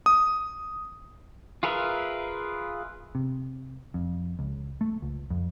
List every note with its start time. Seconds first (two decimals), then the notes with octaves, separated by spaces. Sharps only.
0.06 D#6
1.63 F4 G#4 A#4 B4 E5
3.15 C3
3.94 F2
4.39 C#2
4.81 A3
5.02 C#2
5.30 F2